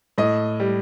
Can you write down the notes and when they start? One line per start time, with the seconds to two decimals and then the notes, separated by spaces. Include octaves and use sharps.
0.18 A2 D#5
0.60 G3